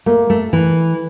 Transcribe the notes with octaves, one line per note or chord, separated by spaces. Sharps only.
A3 A#3
A3
E3